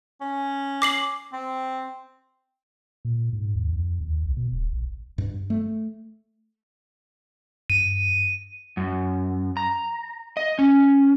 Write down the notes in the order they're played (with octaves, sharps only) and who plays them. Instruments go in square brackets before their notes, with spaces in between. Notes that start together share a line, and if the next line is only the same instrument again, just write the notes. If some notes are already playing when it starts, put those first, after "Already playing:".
[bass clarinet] C#4
[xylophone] D6 C7 F#7
[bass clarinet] C4
[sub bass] A#2
G#2
D#2
F2
D#2
B1
B2
D1
A#1
[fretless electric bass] G2
A3
[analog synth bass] G2 [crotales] D#7
[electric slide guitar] F#2
A#5
D#5
C#4